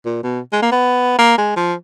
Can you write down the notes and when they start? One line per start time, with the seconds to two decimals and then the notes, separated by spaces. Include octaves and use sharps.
0.05 A#2
0.23 B2
0.53 G#3
0.62 A#3
0.72 B3
1.18 A#3
1.38 G#3
1.56 F3